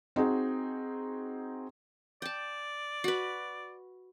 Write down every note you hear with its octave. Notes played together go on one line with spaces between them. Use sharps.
C4 D#4 F#4 G#4
D5 G5 A5
F#4 B4